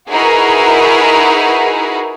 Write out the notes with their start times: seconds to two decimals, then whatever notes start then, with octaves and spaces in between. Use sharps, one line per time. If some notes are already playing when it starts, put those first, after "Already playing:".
0.10 D#4 E4 F#4 G#4 A#4 B4